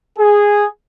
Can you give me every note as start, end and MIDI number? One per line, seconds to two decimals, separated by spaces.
0.19 0.66 68